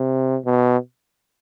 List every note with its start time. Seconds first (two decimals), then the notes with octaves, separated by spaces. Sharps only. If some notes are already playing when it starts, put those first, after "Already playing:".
Already playing: C3
0.46 B2